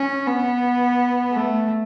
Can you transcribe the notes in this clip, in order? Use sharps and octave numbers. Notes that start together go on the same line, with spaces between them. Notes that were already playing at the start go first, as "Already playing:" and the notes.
Already playing: C#4
B3
A3